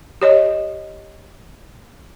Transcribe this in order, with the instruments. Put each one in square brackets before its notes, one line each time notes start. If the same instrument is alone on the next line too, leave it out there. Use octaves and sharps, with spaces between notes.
[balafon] G4 C#5 D#5